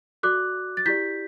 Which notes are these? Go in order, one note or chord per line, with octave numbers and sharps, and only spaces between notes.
F#4 A4 D5 D6 F#6
A6
E4 G4 D5 G6 B6